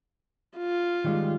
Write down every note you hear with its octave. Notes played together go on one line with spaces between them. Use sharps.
F4
D#3 G3 G#3